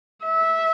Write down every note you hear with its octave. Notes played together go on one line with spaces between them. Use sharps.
E5